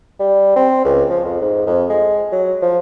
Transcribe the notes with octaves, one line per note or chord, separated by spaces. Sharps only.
G3
C4
C#2
F3
F2
G#2
F2
G#3
F#3
F3